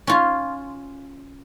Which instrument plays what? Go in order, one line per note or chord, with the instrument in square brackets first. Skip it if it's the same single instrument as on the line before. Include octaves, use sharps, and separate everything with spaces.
[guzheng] C#4 F4